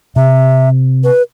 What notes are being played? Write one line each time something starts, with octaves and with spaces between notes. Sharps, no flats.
C3 E5
B4